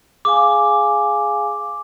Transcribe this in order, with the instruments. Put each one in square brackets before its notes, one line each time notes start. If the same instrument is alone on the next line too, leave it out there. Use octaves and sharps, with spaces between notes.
[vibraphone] G#4 F5 G#5 [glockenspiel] D6